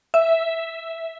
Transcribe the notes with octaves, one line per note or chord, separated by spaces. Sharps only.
E5